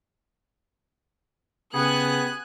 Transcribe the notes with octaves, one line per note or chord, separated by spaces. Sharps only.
C#3 B3 G4 G#4 F#5 G#5 F#6